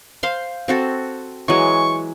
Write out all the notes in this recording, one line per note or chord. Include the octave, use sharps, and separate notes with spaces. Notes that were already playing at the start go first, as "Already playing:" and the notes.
C5 F5 C6
C4 F#4 A4
E3 F#3 G#3 C#6